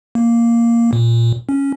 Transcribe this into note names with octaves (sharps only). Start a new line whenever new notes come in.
A#3
A#2
C#4